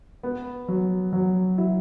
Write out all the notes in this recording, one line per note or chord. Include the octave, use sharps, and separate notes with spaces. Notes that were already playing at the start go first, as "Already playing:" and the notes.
B3
F#3
F#3
E4